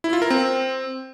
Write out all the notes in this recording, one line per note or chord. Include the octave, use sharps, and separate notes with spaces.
E4
F4
A#4
C4